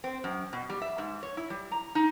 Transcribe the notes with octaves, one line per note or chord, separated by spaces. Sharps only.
C4
F#2
B2
G3
E5
G#2
C#5
E4
G3
A#5
D#4